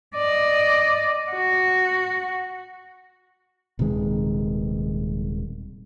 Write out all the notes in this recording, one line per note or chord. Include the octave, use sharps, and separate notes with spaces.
D5 D#5
F#4
D#1 C3 D#3 G#3